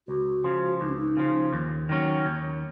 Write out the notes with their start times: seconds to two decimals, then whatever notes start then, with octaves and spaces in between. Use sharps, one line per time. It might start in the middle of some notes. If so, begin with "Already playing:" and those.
0.08 C#2 F#4
0.44 C#3 F3
0.81 C#2 D#4
0.89 C#4
0.96 D#4
1.17 C#3 F3
1.53 D#2
1.89 D#3 F#3 C#4
2.26 D#2